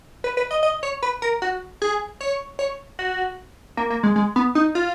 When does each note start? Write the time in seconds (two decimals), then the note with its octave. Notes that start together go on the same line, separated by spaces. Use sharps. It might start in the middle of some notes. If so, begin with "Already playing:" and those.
0.24 B4
0.37 B4
0.51 D#5
0.63 D#5
0.83 C#5
1.03 B4
1.22 A#4
1.42 F#4
1.82 G#4
2.21 C#5
2.59 C#5
2.99 F#4
3.77 A#3
3.90 A#3
4.03 G#3
4.16 G#3
4.36 B3
4.55 D#4
4.75 F4